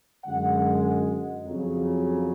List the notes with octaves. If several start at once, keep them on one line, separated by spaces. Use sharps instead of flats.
F#2 D3 G#3 F#5
F2 C#3 F#3